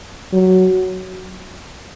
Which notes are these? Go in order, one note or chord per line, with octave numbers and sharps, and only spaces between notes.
F#3